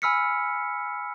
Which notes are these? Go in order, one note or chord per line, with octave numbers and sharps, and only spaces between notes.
G#5 B5 E6 F6 B6 C#7